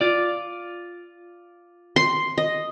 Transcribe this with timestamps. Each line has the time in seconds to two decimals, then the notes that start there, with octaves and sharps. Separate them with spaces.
0.01 F4 D5
1.96 C6
2.38 D#5